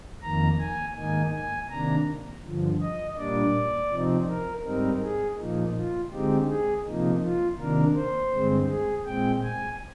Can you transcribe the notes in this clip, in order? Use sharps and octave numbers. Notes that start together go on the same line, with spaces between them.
F2 D#3 A#3 A#5
G#5
G#2 D#3 A#3 D#4 G#5
G#5
C3 D#3 A#3 D4 A#5
G2 D3 F3
D#5
A#2 G3 A#3 D4 D5
C3 F3 C4 D#4
A#4
G#2 G3 C4 D#4 A#4
G#4
A#2 F3 A#3 D#4
F4
D3 G#3 C4 D#4 G4
G#4
C3 F3 A#3 D#4
F4
C3 D#3 A#3 D4 A#4
C5
G2 D3 G#3 C4
G#4
A#2 G#3 C4 G5
G#5